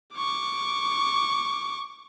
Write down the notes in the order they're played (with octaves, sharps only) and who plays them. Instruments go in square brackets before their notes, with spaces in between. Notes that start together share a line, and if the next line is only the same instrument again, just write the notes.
[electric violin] C#6 D6